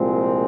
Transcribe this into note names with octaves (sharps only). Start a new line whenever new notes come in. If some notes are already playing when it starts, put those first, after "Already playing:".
Already playing: C2 A#2 F3 G#3 C4